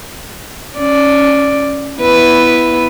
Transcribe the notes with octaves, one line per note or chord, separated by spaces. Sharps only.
C#4 D5
B3 E4 B4